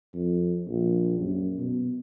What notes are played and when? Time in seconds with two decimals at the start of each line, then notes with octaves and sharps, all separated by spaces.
0.14 F2
0.67 A#1
1.19 F#2
1.59 B2